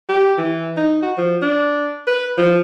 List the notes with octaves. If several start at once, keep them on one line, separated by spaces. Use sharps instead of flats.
G4
E3
D#4
F#4
F3
D4
B4
F3